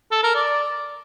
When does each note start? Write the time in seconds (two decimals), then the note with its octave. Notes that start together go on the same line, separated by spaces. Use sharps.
0.12 A4
0.23 A#4
0.35 D5